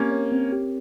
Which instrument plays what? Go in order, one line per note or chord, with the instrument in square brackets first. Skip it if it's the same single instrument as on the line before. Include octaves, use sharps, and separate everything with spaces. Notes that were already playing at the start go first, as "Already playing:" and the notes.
Already playing: [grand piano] A#3 C#4 [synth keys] C4 G4 A#4 C#5
[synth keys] C#5
C4
G4